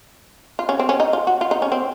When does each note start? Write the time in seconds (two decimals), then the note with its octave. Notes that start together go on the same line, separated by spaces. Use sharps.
0.59 F4
0.69 C#4
0.79 C4
0.89 C#4
1.00 D#4
1.13 F4
1.27 F#4
1.41 F4
1.51 D#4
1.62 C#4
1.72 C4